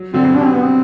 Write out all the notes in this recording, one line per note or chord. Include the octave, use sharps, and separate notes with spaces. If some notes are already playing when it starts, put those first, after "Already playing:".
Already playing: F#3
D3 F#3 C4
B2 D3
C3 D4
C4
B3
C4